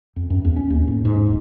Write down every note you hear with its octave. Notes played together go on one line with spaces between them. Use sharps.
F2
F#2
E2
C#4
D#2
A2
G#2
D#1